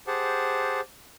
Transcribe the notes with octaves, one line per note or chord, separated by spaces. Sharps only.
G4 G#4 C5 F#5 A5